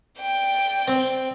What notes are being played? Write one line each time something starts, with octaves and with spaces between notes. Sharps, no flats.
D5 G5
C4